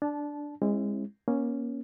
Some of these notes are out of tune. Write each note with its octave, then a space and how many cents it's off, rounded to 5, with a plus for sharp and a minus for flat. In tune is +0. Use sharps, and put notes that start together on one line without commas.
D4 +0 A5 -20
G#3 -20 C4 +45 E4 +0
A#3 +25 C#4 +0